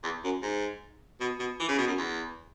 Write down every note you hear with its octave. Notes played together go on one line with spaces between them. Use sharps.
E2
F#2
G#2
B2
B2
E3
C#3
B2
F#2
E2